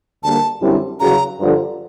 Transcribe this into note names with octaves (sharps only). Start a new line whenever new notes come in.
D2 D3 G3 A#3 A5
F#2 D3 G3 C4 E4
E2 C#3 F#3 A#5
G2 D3 F3